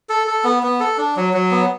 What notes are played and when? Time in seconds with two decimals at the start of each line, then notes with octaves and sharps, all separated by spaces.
0.09 A4
0.27 A4
0.44 B3
0.63 B3
0.80 A4
0.97 D4
1.17 F#3
1.33 F#3
1.51 B3